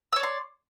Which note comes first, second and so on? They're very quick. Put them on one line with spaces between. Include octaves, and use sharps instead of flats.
E6 C#5 D5 C6